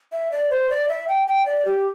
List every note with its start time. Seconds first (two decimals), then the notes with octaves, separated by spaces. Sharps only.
0.12 E5
0.32 D5
0.50 C5
0.70 D5
0.88 E5
1.08 G5
1.27 G5
1.46 D5
1.65 G4